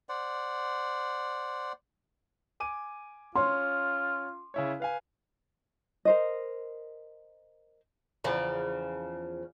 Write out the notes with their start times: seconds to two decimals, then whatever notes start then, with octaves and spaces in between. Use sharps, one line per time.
0.09 C5 D5 F#5
2.60 G#5 D6 D#7
3.35 C#4 F4 C6
4.54 C#3 E4 C#5
4.80 B4 F5 G#5
6.05 A#4 C5 D#5
8.24 E2 C#3 F3